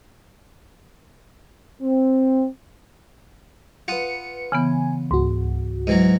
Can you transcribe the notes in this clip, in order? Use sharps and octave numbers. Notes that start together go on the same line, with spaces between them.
C4
F4 B4 F#5 D#6 C#7
C#3 E3 B3 G#5
C#2 G#2 F#4
G#2 E3 F#3 D#5